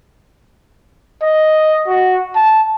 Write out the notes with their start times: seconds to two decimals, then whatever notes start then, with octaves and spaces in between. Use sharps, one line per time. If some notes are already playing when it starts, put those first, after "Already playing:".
1.22 D#5
1.87 F#4
2.35 A5